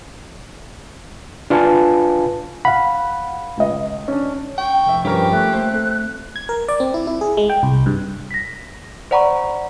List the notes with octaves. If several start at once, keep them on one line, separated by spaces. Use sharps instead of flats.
D4 F4 B4 F5 G#5 A5
F5 F#5 B5
C#2 D#5
C#4 D4
G5 C#6
F1 E5
G2 F3 G3 C#4 G4 A#4
A3 F#6
A#3 C5
C4 A4
G#6
A#4
D5
C4
E4
E4
G#4
G#3
G5
C2
G2
A#6 B6
C5 D5 F#5 A#5 B5 C#6